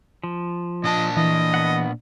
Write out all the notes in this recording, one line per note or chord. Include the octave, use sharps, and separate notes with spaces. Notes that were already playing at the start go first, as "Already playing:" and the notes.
F3
A#2 D4 D#5 A5
E3 D#5
B3 F#5